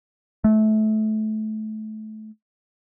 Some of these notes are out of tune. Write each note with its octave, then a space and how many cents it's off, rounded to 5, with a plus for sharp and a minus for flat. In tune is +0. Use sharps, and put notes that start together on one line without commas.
A3 -25